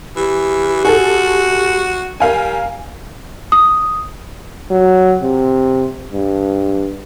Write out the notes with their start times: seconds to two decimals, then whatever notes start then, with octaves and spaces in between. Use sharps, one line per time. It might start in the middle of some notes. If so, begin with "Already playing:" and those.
0.16 E3 G4
0.85 F#4 G#4 A4
2.20 G3 A#4 F5 G#5
3.52 D#6
4.71 F#3
5.22 C3
6.12 G2